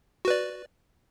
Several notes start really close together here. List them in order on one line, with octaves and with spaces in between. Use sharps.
F#4 B4 D5